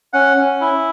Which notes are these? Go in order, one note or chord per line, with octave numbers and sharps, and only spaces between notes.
C#4 F#5
C#4
E4